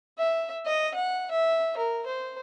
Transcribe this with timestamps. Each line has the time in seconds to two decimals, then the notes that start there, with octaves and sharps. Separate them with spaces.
0.18 E5
0.65 D#5
0.94 F#5
1.31 E5
1.77 A#4
2.06 C5